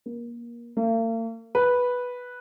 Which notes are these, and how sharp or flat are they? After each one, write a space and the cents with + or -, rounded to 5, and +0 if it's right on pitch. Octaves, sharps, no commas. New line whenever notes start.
A#3 +25
A#3 -45
B4 -5